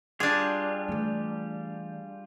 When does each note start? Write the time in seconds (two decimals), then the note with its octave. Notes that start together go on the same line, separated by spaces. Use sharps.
0.20 G3 D4 F4 G4 G#4
0.88 E3 A3